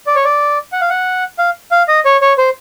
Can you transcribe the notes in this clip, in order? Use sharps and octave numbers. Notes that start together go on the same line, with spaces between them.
D5
C#5
D5
F#5
F5
F#5
F5
F5
D#5
C#5
C#5
C5